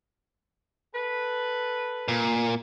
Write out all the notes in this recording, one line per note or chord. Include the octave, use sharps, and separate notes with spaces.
A4 B4
A#2